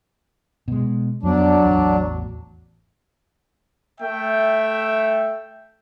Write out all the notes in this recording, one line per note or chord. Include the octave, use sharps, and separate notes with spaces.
B2 G#3
F2 F#3 B3 D4
A1 E2
A3 E5 G5